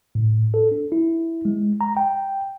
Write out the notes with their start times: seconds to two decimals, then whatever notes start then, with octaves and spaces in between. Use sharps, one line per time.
0.15 A2
0.54 A4
0.71 D4
0.92 E4
1.45 G#3
1.81 A#5
1.97 G5